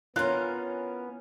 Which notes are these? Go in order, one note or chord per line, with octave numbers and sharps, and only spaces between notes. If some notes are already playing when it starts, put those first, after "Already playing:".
E3 B3 C#4 F4 A#4 F#6